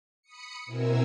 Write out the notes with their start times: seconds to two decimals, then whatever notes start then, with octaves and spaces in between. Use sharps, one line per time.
0.22 B5 D#6 C#7
0.66 B2 C4 E4 A#4 G#5 E6